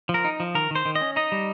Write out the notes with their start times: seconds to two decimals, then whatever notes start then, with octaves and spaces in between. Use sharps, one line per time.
0.09 F3
0.14 A#4
0.25 D#4
0.40 F3
0.55 D#3 A#4
0.71 D#3 C5
0.85 D#3
0.95 D#5
1.01 C#4
1.16 D#4 D#5
1.32 G3